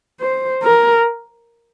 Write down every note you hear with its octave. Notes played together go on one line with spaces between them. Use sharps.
C5
A#4